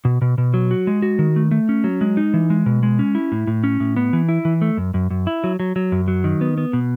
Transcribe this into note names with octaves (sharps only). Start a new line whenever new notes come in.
B2
B2
B2
F#3
F#4
G#3
F#4
D#3
A3
A3
C#4
F#3
G#3
D#4
E3
G#3
B2
G#3
C#4
E4
A2
A2
C#4
A2
B3
E3
E4
E3
A3
F#2
F#2
F#2
E4
F#3
F#3
F#3
F#2
F#3
D#3
B3
B3
B2